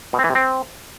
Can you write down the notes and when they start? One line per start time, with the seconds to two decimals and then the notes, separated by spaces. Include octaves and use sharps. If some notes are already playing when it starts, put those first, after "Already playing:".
0.13 B2
0.19 C4
0.24 E3
0.30 C3
0.35 C4